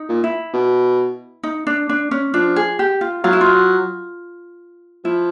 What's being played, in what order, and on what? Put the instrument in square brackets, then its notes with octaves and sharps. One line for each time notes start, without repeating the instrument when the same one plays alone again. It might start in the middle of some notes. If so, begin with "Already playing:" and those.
Already playing: [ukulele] D#4
[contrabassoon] A#2
[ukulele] E4
[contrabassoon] B2
[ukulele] D#4
D4
D4
C#4
[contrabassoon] F3 [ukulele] D4
[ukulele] G#4
G4
F4
[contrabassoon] F#3 [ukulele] F4
[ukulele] E4
F4
[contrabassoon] F3 [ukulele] E4